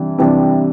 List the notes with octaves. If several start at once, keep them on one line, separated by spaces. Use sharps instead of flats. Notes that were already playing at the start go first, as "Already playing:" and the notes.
Already playing: C3 E3 G3 D4
C3 E3 G3 D4